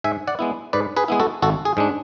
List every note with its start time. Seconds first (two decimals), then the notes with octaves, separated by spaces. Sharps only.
0.04 G#2 E5 G#5
0.27 D5 F#5
0.39 G#3 B3 E4
0.73 G#2 B4 D5
0.97 G#4 B4
1.08 G#3 B3 E4 G#4
1.20 F#4 A4
1.42 G#1 F#4 A4
1.65 G#4
1.77 G#2 G#3 D4